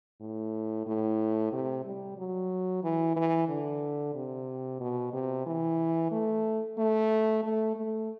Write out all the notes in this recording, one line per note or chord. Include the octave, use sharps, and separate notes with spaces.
A2
A2
C3
G3
F#3
E3
E3
D3
C3
B2
C3
E3
A3
A3
A3
A3